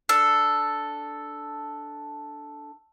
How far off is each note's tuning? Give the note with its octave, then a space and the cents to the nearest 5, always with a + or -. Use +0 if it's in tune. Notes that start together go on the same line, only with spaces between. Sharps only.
D4 +0 A4 +0